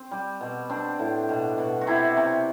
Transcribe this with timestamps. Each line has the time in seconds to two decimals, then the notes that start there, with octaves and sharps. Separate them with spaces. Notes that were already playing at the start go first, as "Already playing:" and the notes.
Already playing: C4
0.11 G3
0.41 B2
0.69 C4 D4
0.99 A2
1.29 B2
1.58 B2
1.81 F#4
1.87 C3 E4
2.17 C3